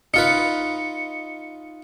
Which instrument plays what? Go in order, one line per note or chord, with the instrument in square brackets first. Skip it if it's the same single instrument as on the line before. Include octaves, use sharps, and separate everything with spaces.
[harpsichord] D#4 F4 B4 [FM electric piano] C#7